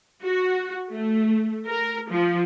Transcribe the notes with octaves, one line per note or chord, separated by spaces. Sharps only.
F#4
A3
A#4
F3